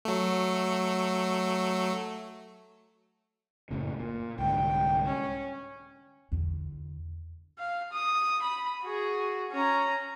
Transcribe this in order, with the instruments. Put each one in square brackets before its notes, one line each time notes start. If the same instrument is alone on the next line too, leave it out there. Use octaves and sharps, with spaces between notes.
[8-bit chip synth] F#3 A3
[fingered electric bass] F#1 A2 C#3
A#2
[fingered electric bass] C2 G#2 D3 [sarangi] G5
[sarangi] C#4
[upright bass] E2 D3
[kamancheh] F5
D#6
B5
F#4 G#4
C#4 A#5